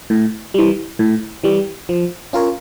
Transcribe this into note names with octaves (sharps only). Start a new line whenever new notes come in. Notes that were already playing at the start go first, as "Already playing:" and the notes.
A2
E3 G3
A2
E3 G3
F3
C#4 F4 A#4 C#5